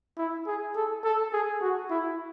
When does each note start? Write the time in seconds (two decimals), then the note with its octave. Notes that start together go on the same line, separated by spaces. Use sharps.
0.18 E4
0.47 G#4
0.76 A4
1.04 A4
1.33 G#4
1.61 F#4
1.90 E4